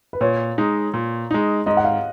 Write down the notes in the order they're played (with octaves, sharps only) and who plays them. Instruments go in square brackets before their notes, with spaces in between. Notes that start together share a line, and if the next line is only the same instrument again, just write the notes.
[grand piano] B4
[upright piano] A#2 [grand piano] C#5
[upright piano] G#3 D#4
A#2
G#3 D#4
[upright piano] G#2 [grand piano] D#5
[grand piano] F#5
F5